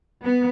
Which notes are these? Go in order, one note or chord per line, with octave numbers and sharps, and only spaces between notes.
B3